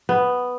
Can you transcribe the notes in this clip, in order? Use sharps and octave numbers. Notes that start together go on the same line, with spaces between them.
B3